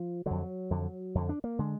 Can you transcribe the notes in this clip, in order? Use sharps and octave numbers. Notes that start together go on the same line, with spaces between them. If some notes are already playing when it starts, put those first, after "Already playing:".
Already playing: F3
F2 D3 F#3
F2 D3
F2 D3
D4
A#3
D3 G#3